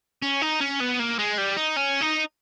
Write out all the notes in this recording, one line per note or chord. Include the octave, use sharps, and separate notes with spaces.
C#4
D#4
C#4
B3
A#3
G#3
G3
D#4
C#4
D#4